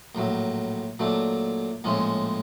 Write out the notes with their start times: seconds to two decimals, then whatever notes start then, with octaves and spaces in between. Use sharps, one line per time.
0.15 A#1 A2 F#3
0.99 A#2 F#3 A3 D4
1.84 A#1 A2 F3 G#3 C#4